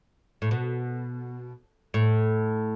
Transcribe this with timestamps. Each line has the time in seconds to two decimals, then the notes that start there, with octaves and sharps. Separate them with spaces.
0.42 A2
0.51 B2
1.94 A2